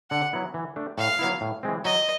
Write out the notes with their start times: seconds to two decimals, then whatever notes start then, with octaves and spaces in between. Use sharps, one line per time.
0.10 D3 F#5
0.33 F#3 B3 E4
0.54 E3
0.76 A3 D4
0.98 A2 F5
1.19 F#3 B3 E4
1.41 A2
1.63 E3 G#3 C4
1.85 F#3 D#5